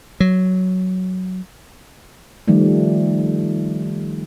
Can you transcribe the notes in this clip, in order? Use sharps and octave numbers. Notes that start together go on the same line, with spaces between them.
F#3
D#3 F3 G3 A3